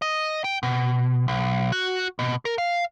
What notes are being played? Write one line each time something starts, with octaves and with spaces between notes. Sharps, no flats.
D#5
G5
B2
B1
F#4
B2
A#4
F5